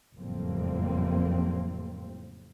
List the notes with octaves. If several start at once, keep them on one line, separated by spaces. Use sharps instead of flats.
F#1 F2 A2 G3 A#3 C4